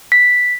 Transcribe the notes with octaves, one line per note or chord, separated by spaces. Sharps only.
B6